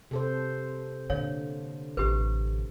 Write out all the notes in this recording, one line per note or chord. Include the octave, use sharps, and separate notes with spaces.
C3 A4 C5
A#2 D3 C#5 F5
A1 C3 G4 B4